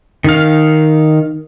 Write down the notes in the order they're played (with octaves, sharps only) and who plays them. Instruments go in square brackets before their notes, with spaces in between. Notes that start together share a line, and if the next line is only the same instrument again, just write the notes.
[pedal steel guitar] D#3 F5